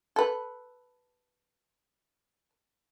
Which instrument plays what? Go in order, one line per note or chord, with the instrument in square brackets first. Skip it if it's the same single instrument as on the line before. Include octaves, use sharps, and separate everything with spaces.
[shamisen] A4 B4